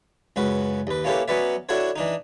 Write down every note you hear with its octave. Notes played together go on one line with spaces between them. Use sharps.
C#2 F#2 F#4 B4
D#2 B4
A#3 C#4 E4 G4 A4 B4
F#3 B3 C#4 B4 D5 E5
D4 E4 F#4 A4 C#5
E3 D4 D#4